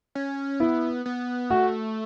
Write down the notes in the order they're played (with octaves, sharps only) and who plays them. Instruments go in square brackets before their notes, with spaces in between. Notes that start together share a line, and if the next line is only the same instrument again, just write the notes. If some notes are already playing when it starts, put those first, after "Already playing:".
[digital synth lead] C#4
[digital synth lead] B3 [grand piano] E4
[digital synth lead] B3
[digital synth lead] A3 [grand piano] F#4